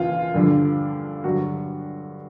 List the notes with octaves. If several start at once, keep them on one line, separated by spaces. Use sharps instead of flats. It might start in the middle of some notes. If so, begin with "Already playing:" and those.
Already playing: D#2 C#3 E3 F4
G2 D3 F3
G2 D3 F#3 F#4